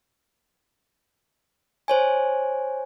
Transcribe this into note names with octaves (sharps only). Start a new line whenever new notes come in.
C5 C#5 G#5